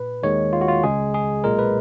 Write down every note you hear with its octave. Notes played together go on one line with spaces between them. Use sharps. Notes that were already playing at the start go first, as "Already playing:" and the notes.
Already playing: A#2 B4
D#2 D#3 G#3 C#5
F4
F#4
F4
C#2 C#3 G#3 G#4
G#4
B1 A#2 G#3 A#4
B4